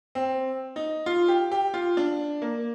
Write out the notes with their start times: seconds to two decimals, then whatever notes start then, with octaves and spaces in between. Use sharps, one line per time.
0.15 C4
0.76 D#4
1.06 F4
1.28 G4
1.52 G4
1.74 F4
1.97 D4
2.42 A#3